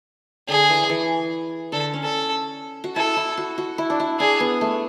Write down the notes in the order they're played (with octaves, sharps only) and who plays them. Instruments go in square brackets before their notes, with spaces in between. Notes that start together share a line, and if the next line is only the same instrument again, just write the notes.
[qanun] D3 [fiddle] G#4
[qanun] E3
E3
[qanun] D3 [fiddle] A4
[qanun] C#4
[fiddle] A4
[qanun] F#4
[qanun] E4 [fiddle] A4
[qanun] E4
F#4
F#4
E4
D4
E4
[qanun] D4 [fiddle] G#4
[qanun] B3
A3